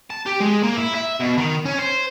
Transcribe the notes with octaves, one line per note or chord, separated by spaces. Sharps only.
A5
G4
G#3
A#3
E4
E5
B2
D#3
C#4
C5